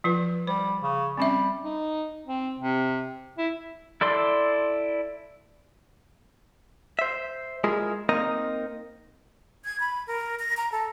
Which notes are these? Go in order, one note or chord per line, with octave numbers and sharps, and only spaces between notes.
F3 F4 B4
G3 C5
C#3
G3 C4 C#4 E5
D#4
C4
C3
E4
E4 A4 D5 C6
C5 E5
G#3 E4 F4 G#4 A#4
A#3 C4 D#4 A#4 D#5
G#6
B5
A#4
A#6
A#5
A4